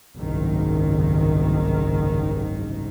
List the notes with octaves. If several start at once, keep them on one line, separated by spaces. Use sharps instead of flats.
F#1 C2 G#2 D#3